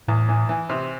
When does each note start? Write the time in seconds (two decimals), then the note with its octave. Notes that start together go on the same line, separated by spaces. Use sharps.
0.08 E2 A2
0.29 E3
0.49 E3
0.69 C3